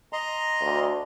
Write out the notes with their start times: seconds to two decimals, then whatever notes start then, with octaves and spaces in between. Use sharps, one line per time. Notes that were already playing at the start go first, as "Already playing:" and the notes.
0.13 D#5 A#5 C6
0.61 D2